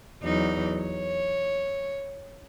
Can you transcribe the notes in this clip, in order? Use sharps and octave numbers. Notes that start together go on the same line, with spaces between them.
E2 F#3 D#4
C#5